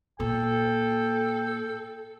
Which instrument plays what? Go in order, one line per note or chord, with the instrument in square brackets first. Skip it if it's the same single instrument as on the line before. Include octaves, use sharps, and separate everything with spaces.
[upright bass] A#2 [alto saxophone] A4 [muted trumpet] G5